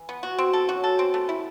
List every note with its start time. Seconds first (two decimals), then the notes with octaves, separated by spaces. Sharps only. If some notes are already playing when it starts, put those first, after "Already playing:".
Already playing: E3
0.09 B3
0.23 B2 F#4
0.38 C4
0.53 A4
0.69 F#2 F#4
0.84 A4
0.99 C4
1.14 A3
1.29 E4